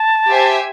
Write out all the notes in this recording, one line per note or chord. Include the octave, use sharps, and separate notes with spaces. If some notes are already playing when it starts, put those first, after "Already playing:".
Already playing: A5
G4 C5 E5 G#5